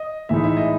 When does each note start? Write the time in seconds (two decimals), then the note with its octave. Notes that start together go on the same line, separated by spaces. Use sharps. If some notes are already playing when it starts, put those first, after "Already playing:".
Already playing: D#5
0.29 A2 E3 G#3 D#4 E5
0.44 E5
0.57 D#5